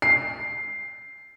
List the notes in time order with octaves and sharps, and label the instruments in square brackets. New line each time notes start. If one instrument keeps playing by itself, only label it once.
[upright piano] C7